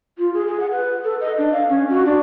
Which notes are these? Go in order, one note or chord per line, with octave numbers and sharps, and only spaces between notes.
F4
G#4
G#4
F#5
B4
A4
D#5
D4
F5
C#4
F#4
D4